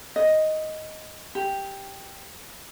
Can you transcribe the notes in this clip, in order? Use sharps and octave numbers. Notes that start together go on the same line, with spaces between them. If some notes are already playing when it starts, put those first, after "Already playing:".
D#5
G4